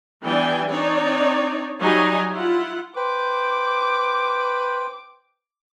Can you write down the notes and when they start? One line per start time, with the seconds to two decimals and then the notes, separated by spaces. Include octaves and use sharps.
0.23 E3 G3 B3 D4 G5 G#5
0.69 C4 D4 D#4 C#5 D5
1.81 F#3 G3 D#4 D#5 G#5 A#5
2.30 E4 F4 F#5
2.96 B4 C5 G5 D6